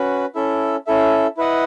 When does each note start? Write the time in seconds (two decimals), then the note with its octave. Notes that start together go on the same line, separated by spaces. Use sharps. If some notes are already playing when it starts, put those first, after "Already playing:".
Already playing: C#4 F#4 B4
0.35 C#4 E4 A4 E5
0.87 C#4 E4 A4 E5
1.37 E4 B4 D#5 F#5